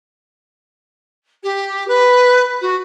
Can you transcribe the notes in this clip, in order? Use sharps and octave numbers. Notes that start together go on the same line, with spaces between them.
G4
B4
F#4